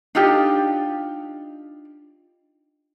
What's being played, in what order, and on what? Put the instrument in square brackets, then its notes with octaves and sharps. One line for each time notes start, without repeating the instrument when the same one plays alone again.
[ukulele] D4 D#4 F4 G4